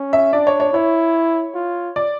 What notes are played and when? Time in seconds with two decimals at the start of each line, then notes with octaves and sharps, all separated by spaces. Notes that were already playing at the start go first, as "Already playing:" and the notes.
Already playing: C#4
0.13 E5
0.33 D4 D5
0.47 C#5
0.60 C#5
0.73 E4 C#5
1.55 F4
1.96 D5